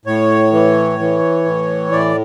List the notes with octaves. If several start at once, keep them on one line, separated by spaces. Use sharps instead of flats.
A2 C#5
E3
E3
A2
A2 D5